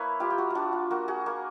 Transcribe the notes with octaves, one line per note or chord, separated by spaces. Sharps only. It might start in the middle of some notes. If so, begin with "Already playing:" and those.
Already playing: A#3 E4 B4 C#5
G3 F4 G4
G4
F#4
D4 F4 F#4
F4
A#3 F#4
F#4 G#4
A#3